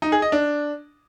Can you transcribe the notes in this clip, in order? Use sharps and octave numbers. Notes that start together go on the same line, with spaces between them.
D#4
G#4
D#5
D4